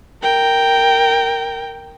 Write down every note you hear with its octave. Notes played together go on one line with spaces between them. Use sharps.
A#4 G5